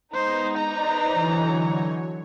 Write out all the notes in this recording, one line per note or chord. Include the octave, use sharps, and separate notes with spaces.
G#3 B3 D#4 C5
B4 C5 D5 A#5
D3 E3 F#3 C#5